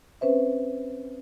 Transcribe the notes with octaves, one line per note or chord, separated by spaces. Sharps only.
C4 C#4 B4 C5 E5